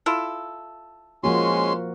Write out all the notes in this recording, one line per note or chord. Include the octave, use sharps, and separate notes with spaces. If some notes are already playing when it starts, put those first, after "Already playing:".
E4 F4 A4
F3 G#3 A#3 C#4 F#4 C6